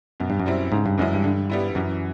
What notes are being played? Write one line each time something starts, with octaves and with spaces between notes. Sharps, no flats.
F#2 B2
G2
F#2
G3 C4 E4
G#2 C#3
G2
F#2 E3 G#3 C#4 E4
G2
D3
G3 B3 E4
F#2 E3